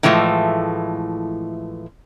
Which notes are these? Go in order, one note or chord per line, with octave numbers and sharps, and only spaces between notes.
A2 E3 F3 G#3 A3